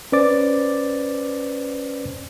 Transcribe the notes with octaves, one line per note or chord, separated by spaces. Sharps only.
C#4 B4 C5 D5 D6 A6